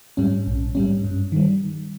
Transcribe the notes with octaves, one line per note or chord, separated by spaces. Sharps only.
G#2 G3 C#4
A#1
G#2 G3 C#4
G2
D#3 G3